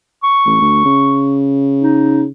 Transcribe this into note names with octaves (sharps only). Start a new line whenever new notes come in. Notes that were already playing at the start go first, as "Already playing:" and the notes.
C#6
A1
D2
C#3
D#4